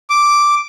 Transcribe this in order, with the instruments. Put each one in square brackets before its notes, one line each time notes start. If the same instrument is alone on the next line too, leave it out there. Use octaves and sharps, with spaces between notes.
[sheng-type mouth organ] D6